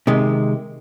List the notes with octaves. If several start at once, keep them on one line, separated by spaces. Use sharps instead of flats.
C3 D#3 G#3